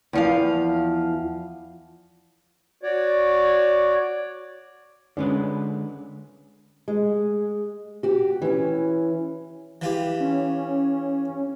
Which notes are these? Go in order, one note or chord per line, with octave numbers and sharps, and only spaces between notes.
E2 F3 F5
F#4 C#5 D5
D3 G#3 C#4 B4
G#3
F#4 G4
E3 C#4
E3 F4 G4
C#4